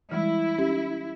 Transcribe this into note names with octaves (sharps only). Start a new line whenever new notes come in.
E3 G3 G#3 E4
C#4 G4